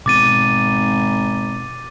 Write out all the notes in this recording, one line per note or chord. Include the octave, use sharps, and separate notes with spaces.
G#1 B2 D6 A6 D#7